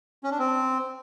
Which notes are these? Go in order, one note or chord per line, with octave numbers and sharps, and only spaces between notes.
C#4
D4
C4